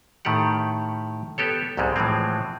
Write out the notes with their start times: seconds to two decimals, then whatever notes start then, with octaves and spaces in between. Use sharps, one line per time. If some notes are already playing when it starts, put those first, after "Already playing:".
0.25 A2 D#3 A3 G4 F#5
1.38 B3 G4 A4 C#5
1.77 C2 G#2 C3 G3 G#3
1.96 A2 E3 F3 G#3 C4